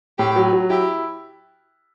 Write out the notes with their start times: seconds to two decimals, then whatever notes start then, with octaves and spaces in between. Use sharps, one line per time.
0.19 A2 G4
0.36 F#3
0.53 F#3
0.70 E4 G4